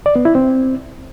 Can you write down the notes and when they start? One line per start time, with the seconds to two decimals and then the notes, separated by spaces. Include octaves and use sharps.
0.06 D5
0.16 B3
0.25 E4
0.35 C4